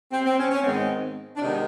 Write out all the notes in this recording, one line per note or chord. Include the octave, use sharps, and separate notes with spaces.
C4
C4
C#4
C#4
G#2 D#3 G#3 B3 C4
D4
C3 D#3 G#3 B3 D#4